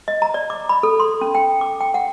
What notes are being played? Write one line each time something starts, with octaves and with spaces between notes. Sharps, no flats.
D#5
A#5
D5
D6
B5
A4
C6
C#4
G5
D6
G5
F#5